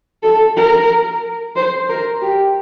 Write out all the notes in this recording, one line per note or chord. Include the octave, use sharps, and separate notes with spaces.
A4
A#4
C5
A#4
G4